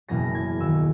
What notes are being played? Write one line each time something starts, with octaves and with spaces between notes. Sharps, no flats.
F#1 E2 B2 A#3 C#4 A#6
G#6
E1 D#2 D#3 E6